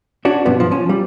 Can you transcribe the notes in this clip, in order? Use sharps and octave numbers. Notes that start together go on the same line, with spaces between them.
C#4 D4 F#4
G2 B2 F3 B3
F3
F3 C#4
G3